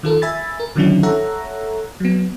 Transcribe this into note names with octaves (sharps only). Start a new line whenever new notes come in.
D#3 F4 A4 A#4
E5 G#5 B5 A6
A#4
D3 D#3 F#3 C#4 D4 E4
A4 C#5 E5 F#5 A#5
F#3 B3